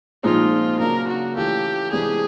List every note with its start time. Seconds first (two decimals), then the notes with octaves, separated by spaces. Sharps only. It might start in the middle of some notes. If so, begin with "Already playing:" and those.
0.23 A#2 F3 G#3 C4 D#4 F4
0.80 C#3 F#3 A#3 D4 A#4
1.08 F#4
1.36 E3 A3 C#4 F4 G4 A4
1.92 C3 E3 G#3 B3 D4 G#4